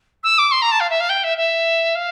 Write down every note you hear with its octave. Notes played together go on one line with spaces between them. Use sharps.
E6
D6
C6
A#5
A5
F5
E5
F5
G5
E5
E5
F5